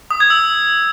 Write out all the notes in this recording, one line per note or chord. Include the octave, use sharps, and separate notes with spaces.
D#6
G#6
E6